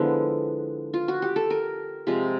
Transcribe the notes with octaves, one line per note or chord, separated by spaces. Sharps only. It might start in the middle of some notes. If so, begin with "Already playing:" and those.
Already playing: D3 F3 G#3 B3 E4
F4
F#4
G4
A4
A#4
C3 F3 G#3